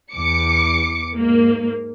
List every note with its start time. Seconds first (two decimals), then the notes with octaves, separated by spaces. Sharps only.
0.12 E2 D6 C#7
1.15 G#2 A#3